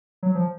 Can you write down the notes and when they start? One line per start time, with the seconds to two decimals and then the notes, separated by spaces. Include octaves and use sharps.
0.23 F#3
0.35 F3